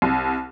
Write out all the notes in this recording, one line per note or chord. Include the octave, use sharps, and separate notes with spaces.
C2